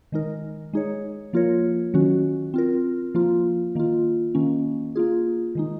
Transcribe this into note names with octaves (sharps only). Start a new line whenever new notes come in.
D#3 G#3 D#4 A#4
G#3 D#4 G#4 C#5
F3 A#3 F4 A#4 C#5
D#3 F#3 C#4 F#4
C4 F4 A#4
F3 A#3 F4
D#3 A#3 F4
D#3 A#3 C#4
A#3 F4 G#4
D#3 G#3 D#4